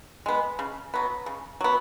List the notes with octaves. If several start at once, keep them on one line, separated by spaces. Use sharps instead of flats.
G#3 B3
C#3
F#3 B3
C#3
F#3 B3